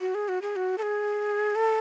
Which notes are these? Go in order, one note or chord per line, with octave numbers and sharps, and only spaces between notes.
F#4
G#4
F#4
G#4
F#4
A4
G#4
A4